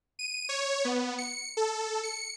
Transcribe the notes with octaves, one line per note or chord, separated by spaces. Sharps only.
D#7
C#5
B3
C#7
A4
C#7